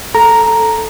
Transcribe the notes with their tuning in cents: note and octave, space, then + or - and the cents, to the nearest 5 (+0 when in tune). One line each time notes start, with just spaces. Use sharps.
A4 +0 A#5 +0